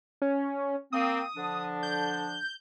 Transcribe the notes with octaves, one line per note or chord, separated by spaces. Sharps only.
C#4
A#3 C4 D#6
D3 F3 D4
G6